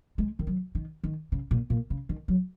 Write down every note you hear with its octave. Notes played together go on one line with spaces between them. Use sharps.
G#3
D#3
F#3
D#3
D#3
C#3
A#2
A#2
C#3
D#3
F#3